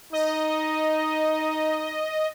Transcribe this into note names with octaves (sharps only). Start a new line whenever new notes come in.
D#4 D#5